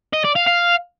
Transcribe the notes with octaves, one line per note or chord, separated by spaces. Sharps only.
D#5
D5
F5
F5